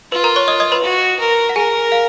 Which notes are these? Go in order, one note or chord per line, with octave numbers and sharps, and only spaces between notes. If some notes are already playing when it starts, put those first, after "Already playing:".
F4 B4
A#4 A#5
C#5 C#6
D#5 D#6
D#5 D#6
B4 B5
F#4
A#4
F#5
G#4 A#4 G#5
F5